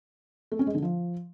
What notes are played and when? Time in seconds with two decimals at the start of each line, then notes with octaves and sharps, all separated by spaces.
0.52 A3
0.59 C#4
0.67 G#3
0.75 D3
0.82 F3